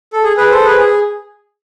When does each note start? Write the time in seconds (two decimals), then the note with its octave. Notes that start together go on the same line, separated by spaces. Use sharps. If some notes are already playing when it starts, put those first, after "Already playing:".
0.13 A4
0.24 G#4
0.37 G#4 B4
0.51 A4 C5
0.65 G#4 B4
0.79 G#4